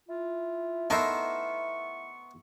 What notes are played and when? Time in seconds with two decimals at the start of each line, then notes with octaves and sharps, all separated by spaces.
0.08 E4 F4
0.90 A3 B3 D#4 A#4 C5 E5 C#6